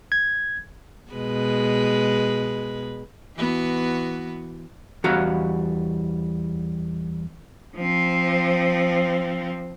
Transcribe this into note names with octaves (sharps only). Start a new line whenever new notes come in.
G#6
B2 G#3 B4
E3 B3 F#4
E2 G3 F#4 F5 A#5
F3 C4